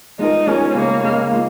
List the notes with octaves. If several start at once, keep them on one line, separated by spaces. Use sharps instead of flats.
G#3 D#4 F4 A#4
G#3 C#4 F4 A#4
C#3 G#3 A#3 D#4 C#5
C#3 G#3 A#3 D#4 C#5
G#3 F4